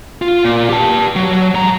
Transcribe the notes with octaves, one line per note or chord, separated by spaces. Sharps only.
F4
A#2
G4 A5
F#3
G#2 A#5